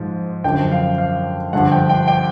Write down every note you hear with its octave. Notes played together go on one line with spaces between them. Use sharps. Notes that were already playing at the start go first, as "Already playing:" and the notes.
Already playing: G#2 F3
F#2 D3 F3 G5
F5
F5
G2 D3 F3 F#5
G5
G5
G5